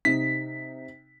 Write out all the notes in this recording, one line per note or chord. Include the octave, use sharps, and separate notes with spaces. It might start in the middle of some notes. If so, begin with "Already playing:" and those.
C3 D#4 B6